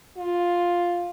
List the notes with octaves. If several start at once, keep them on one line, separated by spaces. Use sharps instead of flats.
F4